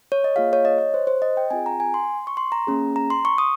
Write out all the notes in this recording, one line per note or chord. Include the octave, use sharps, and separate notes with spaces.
C#5
D#5
A#3 F4 G#4 F5
C#5
D#5
C#5
C5
C5
D#5
G5
C4 F4 G#4 G#5
A#5
G#5
C6
C#6
C6
A#5
A#3 C#4 G#4
A#5
C6
C#6
D#6